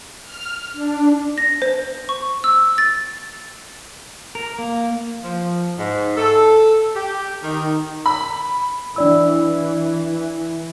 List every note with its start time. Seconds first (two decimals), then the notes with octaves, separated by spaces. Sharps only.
0.22 F6
0.72 D4
1.38 A#6
1.62 C5
2.09 C#6
2.44 E6
2.78 A6
4.35 A#4
4.58 A#3
5.23 F3
5.78 G#2
6.17 A4
6.95 G4
7.43 D#3
8.06 B5
8.96 E3 D4 D5 E6